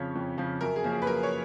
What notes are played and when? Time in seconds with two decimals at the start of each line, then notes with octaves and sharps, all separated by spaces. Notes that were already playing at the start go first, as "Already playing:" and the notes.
Already playing: F2 C#3 F3 C#5
0.15 F2
0.38 C#3 F3
0.61 F#2 A#4
0.76 G#4
0.84 F3 A#3 C#4
0.91 G#4
1.02 B4
1.07 F#2 A#4
1.23 C#5